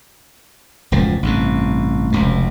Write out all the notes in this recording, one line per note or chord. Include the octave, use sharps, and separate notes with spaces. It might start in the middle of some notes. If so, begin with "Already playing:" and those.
E1 C#2 A2 F3
A1 G2 C3
F1 C#2 B2